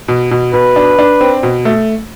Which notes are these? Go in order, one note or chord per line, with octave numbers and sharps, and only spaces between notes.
B2
B2
B2 B4
D4
D4
C4
B2
A3